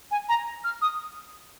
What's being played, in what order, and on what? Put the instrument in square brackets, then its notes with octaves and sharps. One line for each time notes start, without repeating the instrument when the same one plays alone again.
[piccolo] G#5
A#5
F6
D#6